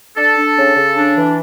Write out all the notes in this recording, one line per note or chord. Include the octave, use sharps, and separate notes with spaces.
D4 A4
D4
C#3
C#3
D4
E3